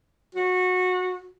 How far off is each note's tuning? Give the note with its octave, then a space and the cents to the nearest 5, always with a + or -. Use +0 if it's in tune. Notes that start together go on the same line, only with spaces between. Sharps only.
F#4 -20